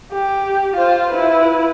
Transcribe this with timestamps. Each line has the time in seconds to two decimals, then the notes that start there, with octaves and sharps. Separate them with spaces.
0.12 G4
0.76 F4 C5
1.11 E4 B4